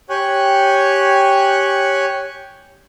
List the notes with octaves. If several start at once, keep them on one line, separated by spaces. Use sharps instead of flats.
G4 C#5 G5 G#5 C#6 F#6